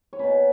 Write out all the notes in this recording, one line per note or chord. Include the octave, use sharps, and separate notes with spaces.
C#5
B2 A#3 C#4 B4